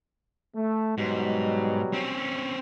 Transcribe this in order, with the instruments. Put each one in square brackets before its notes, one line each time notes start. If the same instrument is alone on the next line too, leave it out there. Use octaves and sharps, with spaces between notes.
[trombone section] A3
[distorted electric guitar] G#2 [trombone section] B2 F#3 G3
[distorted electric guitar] C4 C#4